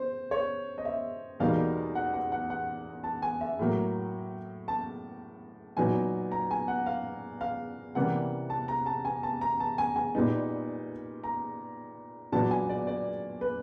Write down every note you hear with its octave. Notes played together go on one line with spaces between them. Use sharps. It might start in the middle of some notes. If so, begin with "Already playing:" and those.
Already playing: C5
C#5
D#5
E5
E2 B2 G3 A#3 D#4 F5
F#5
F#5
F#5
F#5
A5
G#5
E5
A2 F#3 A#3
A5
A#2 F#3 B3 D#4 G#5
A#5
G#5
F#5
F5
F5
C3 E3 G3 A#3 C#4 F#5
A5
A#5
A5
G#5
A5
A#5
A5
G#5
G#5
A#2 G3 B3 D#4
A#5
A#2 F#3 B3 D4 A5
G#5
D5
D5
B4